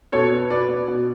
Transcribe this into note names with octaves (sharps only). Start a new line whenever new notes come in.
B2 A4 C#5
B3
B2 B4 D5
B2
B2